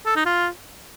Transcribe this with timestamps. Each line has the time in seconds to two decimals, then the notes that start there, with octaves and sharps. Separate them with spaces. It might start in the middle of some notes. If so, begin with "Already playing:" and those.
0.06 A4
0.16 D#4
0.26 F4